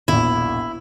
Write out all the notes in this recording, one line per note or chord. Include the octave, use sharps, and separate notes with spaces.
E1 A#1 E4